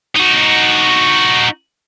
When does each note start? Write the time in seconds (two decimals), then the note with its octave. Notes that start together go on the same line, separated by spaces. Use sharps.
0.15 D#4 F#4